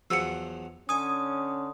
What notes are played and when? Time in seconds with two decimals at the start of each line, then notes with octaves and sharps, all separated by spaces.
0.10 E2 F3 F#3 E6 C#7
0.89 D3 C#4 G#5 D#6